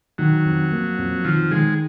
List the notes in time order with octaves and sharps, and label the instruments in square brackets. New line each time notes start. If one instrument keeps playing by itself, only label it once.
[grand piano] D#3 [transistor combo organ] F#3
[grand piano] F2
A#3
F2
[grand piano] D#3 [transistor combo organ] F3
[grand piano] D#3 [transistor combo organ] G#3